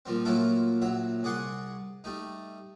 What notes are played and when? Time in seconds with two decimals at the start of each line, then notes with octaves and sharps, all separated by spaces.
0.06 A#2 F3 G3 C4
0.25 A#2 F#3 A3 E4 F4 A4
0.82 A#1 F#3 E5
1.23 C2 G#4 D5 F#5 C6 C#6
2.04 G3 A3 D#4